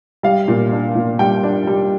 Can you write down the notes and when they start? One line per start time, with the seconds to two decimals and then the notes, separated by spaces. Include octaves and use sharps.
0.23 G3 F5
0.48 A#2
0.72 D4
0.95 A#2
1.19 G3 G5
1.43 D4
1.67 G3